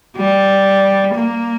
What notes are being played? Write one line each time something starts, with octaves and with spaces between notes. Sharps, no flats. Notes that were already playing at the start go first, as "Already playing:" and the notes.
G3
A#3